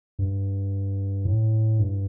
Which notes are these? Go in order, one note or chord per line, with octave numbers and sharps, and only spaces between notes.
G2
A2
G2